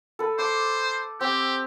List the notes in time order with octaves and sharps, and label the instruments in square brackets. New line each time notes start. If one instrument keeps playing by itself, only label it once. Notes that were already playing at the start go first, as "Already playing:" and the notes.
[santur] A4 B4
[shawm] C5 [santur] D6
[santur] C4 [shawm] G4